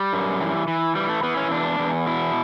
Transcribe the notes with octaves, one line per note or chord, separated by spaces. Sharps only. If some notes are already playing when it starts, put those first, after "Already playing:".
Already playing: G3
F#2
E3
E3
E3 G3
A3
E3 B3
C#4
E2 D4
E2
B2 E4